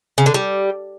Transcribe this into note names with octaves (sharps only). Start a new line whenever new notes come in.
C#3
D3
G3